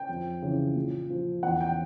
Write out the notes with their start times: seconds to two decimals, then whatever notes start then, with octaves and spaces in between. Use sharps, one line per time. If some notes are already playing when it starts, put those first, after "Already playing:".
Already playing: G5
0.09 F2
0.42 C#3 E3
0.75 A#2
1.10 F3
1.43 E2 F#5
1.61 G5